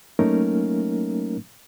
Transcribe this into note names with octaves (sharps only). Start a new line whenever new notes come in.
F#3 A3 A#3 C#4 D#4 A#4